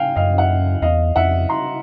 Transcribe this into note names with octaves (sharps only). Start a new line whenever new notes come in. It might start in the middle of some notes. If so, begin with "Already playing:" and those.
Already playing: F5 G5 G#5
F#2 D#5 F5
E5 F#5
E2 D#5 F5
F2 E5 F#5
A#5 C6